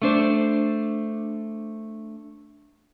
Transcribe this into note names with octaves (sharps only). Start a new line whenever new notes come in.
A3 D4 C5